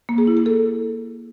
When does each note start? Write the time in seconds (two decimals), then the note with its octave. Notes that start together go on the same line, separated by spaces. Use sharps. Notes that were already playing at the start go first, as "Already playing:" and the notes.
0.09 A#3
0.18 G#4
0.27 E4
0.37 G#4
0.46 A4